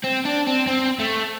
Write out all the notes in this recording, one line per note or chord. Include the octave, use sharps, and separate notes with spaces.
C4
D4
C4
C4
A3